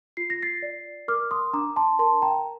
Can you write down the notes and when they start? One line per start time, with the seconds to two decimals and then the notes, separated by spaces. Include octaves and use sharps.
0.17 F4 C7
0.30 A#6
0.42 A6 C7
0.62 D5
1.08 A#4 D6 F6
1.31 C6 D#6
1.53 D4 A#5 D6
1.76 A5 C6
1.99 A#4 A5 C6
2.22 G5 A#5